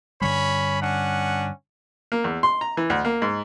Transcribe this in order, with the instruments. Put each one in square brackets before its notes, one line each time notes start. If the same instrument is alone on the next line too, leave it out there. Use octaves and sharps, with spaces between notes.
[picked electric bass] G2 D3 G3 [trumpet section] C#4 C#5 B5
[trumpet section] C#4 D4 F#5
[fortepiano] A#3
E2
C6
A#5
E3
D2
A#3
G#2